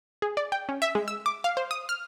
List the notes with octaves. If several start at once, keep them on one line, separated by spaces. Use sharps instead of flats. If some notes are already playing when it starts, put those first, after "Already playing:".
G#4
D5
G5
C#4
E5
G#3
E6
D6
F5
C5
D#6
F6